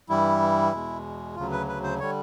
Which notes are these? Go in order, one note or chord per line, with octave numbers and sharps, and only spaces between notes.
G2 E3 G3 E4
E2 B2 G#3
D2 C#3 F#3 F4
B4
B4
C5
D3 G3 C#5